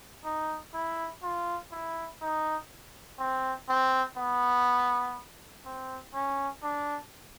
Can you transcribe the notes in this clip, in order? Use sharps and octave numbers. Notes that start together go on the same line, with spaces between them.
D#4
E4
F4
E4
D#4
C4
C4
B3
C4
C#4
D4